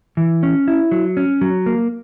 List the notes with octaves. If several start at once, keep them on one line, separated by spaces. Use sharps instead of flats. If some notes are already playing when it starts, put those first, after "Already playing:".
E3
C#4
E4
F#3
C#4
F#3
A#3